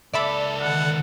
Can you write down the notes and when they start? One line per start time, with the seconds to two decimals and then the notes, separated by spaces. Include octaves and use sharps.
0.13 C#2 A4 D5 E5 B5
0.61 D3 D#3 F#5